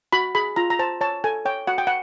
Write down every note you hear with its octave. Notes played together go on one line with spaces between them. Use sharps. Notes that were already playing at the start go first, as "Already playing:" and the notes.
F#4 B5
G#4 B5
F4 A#5
A#5
C5 A5
C#5 A5
A4 G#5
C#5 G5
F#4 F#5
G5
F#5